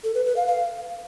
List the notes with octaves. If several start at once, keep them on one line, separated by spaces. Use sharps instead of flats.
A4
B4
B4
F5
F5